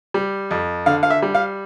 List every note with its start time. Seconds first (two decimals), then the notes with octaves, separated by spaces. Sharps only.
0.14 G3
0.51 F2
0.86 D3 F5
1.03 F5
1.10 E5
1.22 G3
1.35 F5